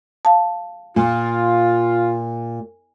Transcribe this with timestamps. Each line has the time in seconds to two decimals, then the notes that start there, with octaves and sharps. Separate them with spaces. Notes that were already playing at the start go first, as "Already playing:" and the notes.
0.25 F5 A5
0.96 A#2 F4